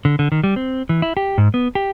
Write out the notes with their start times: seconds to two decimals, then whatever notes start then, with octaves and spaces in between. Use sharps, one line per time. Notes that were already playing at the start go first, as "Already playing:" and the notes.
0.05 D3
0.19 D3
0.32 D#3
0.44 G3
0.56 C4
0.89 E3
1.02 E4
1.17 G4
1.38 G#2
1.54 B3
1.75 G4